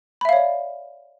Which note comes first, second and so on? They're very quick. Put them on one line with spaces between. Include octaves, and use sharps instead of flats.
B5 E5 F5 C#5 D5